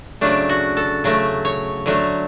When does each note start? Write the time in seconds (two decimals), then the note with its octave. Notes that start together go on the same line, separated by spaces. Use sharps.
0.21 C#3 F#3 A3 D4
0.49 F#4
0.77 A4
1.04 C#3 F#3 A3
1.45 C#5
1.86 D3 F#3 A3